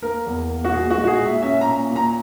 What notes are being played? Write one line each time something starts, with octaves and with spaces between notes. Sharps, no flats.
A#3 A#4
E2
A#3
F#4
A#2 G#4
F#4
G#3
F#4
G#4
A#2
E5
C#4 E5
A#5
A#2
A#2
A#5